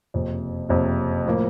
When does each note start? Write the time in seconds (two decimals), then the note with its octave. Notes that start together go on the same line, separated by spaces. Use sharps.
0.14 F#1 F2 C3
0.69 F#1 F2 C3
1.25 A2 F3 A#3